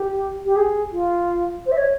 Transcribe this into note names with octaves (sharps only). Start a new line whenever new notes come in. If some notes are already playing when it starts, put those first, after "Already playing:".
Already playing: G4
G4
G#4
F4
C5
E5
C#5